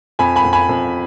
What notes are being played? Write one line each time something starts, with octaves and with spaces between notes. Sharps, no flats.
F2 G#5 B5
G#5 B5
F2
G#5 B5
F2